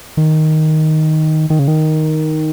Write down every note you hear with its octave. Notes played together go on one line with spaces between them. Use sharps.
D#3
D#3
C#3
D#3